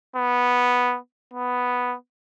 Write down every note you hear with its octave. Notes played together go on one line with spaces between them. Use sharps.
B3
B3